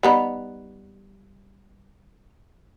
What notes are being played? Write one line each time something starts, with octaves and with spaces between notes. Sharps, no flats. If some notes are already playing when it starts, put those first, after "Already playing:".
G3 B3 D#4